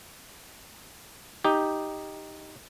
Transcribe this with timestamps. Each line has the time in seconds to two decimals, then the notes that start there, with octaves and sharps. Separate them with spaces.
1.44 D#4 G4